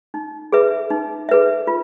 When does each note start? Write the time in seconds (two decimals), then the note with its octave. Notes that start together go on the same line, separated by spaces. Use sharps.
0.14 D#4
0.52 G#4 B4 E5
0.90 D#4
1.29 G#4 B4 E5
1.67 F4